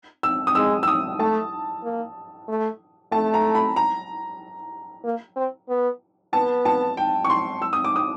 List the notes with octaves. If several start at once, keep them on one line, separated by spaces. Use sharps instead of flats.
E6
D#6
G#3 E6
E6
D#6
A3 A5
A#3
A3
A3 A5
A#5
B5
A#5
A#3
C4
B3
B3 A5
A5
G5
C#6
C6
E6
D#6
D6
D#6